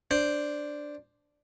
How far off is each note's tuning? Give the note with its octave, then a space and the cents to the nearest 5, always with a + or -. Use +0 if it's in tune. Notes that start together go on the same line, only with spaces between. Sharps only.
D4 +0 C5 +0